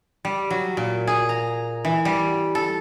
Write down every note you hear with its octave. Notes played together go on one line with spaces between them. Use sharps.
G3
F#3
A#2
G#4
A#5
E3
G3
A4